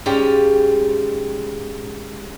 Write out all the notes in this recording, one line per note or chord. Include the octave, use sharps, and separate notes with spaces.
G#2 G3 C#4 G4 F5